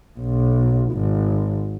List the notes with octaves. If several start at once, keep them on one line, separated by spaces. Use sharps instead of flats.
B1
G#1